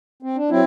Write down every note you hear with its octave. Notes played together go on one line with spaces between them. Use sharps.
C4
D4
F#3 C4 E4